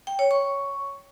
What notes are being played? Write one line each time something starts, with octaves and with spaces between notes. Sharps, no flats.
G5
C#5
C#6